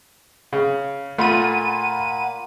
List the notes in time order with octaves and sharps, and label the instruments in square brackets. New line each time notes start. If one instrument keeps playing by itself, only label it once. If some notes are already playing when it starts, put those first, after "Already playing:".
[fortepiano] C#3
[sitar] A#2 [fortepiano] A3 F4 [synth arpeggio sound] F#5 B5 D#7